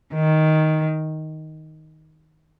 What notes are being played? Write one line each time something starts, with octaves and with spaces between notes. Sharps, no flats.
D#3